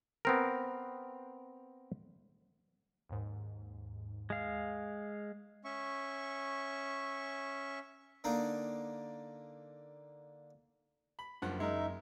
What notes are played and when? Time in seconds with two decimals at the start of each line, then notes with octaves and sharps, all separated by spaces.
0.25 B3 C4 A#4
3.09 D#2 G#2
4.30 G#3 F5
5.64 C#4 E5 C#6
8.24 D3 A#3 D4 D#4
11.19 B5
11.42 F#1 G2 F3 F#5
11.60 G#3 D#4 A#4 E5